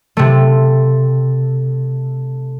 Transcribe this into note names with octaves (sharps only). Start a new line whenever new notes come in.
C3 A3